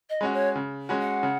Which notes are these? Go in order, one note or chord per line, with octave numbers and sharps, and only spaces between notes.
D#5
G#3 C#4 F#4
C#5
C#3
G#3 C#4 F#4
F#5
C#3